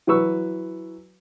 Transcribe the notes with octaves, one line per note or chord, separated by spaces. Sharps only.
E3 F#3 B4 C#6 E6